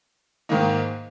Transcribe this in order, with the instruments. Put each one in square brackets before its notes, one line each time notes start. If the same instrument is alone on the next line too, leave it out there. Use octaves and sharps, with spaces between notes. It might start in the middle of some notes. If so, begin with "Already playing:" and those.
[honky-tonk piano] G#2 D#3 A#3 D#4